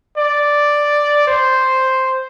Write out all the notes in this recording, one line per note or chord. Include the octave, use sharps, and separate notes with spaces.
D5
C5